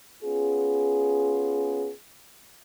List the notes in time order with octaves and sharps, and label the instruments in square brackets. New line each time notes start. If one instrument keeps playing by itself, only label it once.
[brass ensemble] B3 C#4 F4 G#4